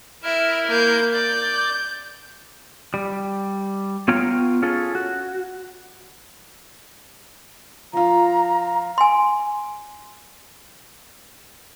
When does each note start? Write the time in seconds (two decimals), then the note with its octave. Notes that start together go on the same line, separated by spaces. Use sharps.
0.23 E4 A#4 E5 F6
0.68 A#3 G6
1.13 D5 D6 G6
2.94 G3
4.08 B3 F4 C#5 F5 G5 A#5
4.62 C#4 F4 G#4 A4
4.95 F#4
7.93 F3 F4 A#5
8.98 G#5 C6